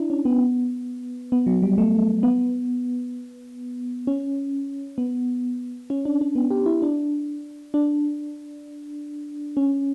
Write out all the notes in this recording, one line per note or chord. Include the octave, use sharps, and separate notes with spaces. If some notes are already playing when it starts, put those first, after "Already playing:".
Already playing: D4 E4
C#4
B3
B3
F#3
G3
A3
B3
C#4
B3
C#4
D4
D4
B3
G4
E4
D4
D4
C#4